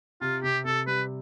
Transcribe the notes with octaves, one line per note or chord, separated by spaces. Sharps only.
C3 F4
C3 G4
C3 A4
G3 B4